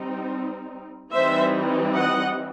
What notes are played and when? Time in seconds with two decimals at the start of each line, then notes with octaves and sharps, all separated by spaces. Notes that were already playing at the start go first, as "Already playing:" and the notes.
Already playing: G3 C4 D#4
1.13 E3 G3 C4 D#4 C5 E5
1.94 D#5 F#5